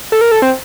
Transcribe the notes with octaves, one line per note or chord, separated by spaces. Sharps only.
A4
A#4
A4
C4